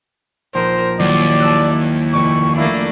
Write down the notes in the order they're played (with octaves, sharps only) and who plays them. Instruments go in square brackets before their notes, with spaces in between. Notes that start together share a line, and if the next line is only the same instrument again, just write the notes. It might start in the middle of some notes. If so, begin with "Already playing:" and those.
[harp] A#1 D#4 [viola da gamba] A#4 [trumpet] C5
[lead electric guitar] D#2 [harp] F#3 [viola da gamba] E4 [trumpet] D5
[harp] A5 E6 F#6
[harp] F1 D5 [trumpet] C#6
[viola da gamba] A3 A#3 D4 [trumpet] E4